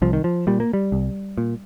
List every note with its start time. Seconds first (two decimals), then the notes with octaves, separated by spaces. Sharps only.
0.02 C2 F3
0.13 D#3
0.24 F3
0.47 A#2 G3
0.60 A#3
0.73 G3
0.92 C2
1.38 A#2